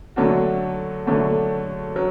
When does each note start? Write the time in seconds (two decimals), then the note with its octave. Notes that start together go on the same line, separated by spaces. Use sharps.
0.16 D3 F#3 A3 D4 F#4
1.06 D3 F#3 A3 D4 F#4
1.96 F#3